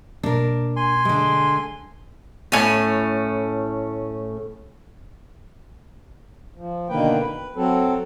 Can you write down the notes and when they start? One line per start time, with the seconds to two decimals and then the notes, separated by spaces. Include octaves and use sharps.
0.23 B2 A#3 D4 A#4
0.76 G#5 C6
1.05 D3 G#3
2.52 A2 C#4
6.56 F3
6.89 B2 D3 D#3 A#3 B4 G5
7.20 B4
7.56 F#3 C4 A4